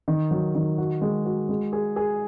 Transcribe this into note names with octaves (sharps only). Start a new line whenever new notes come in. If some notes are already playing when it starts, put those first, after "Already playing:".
D#3
F#3
D#3
F#4
G#3
F#4
G#3
G#4
G#4